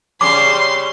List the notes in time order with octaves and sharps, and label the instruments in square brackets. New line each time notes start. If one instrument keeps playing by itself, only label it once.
[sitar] C#3 G3 C#4 [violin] C6 [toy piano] D6